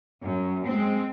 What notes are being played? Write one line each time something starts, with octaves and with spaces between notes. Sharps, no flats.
F#2
G#3 C4